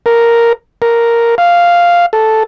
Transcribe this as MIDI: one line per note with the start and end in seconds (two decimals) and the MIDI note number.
0.06 0.53 70
0.82 1.35 70
1.38 2.06 77
2.13 2.43 69